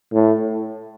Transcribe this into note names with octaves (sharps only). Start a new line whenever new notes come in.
A2